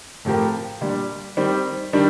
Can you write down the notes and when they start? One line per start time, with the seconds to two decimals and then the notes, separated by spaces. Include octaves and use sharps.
0.25 A2 F3 C4 G4 A#4
0.81 A#2 G3 D4
1.37 D#3 G3 C4
1.93 D#3 G3 D4